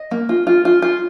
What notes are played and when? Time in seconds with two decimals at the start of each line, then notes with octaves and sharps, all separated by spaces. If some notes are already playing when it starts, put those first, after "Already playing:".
Already playing: D#5
0.11 A#3
0.29 F4
0.47 F4
0.65 F4
0.82 F4